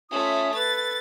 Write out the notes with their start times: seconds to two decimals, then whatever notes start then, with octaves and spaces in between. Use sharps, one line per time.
0.11 A3 C#4 F4 E5 D#6
0.55 A4 B4 A6